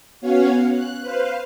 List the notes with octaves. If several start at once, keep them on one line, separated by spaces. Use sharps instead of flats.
B3 C#4 F#4 C#5 F5
F#6
B4 C5 F5